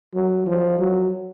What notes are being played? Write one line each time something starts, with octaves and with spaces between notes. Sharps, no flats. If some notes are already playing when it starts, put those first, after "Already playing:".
F#3
F3
F#3